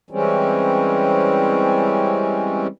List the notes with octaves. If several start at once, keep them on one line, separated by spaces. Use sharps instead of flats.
E3 G3 G#3 C4 C#4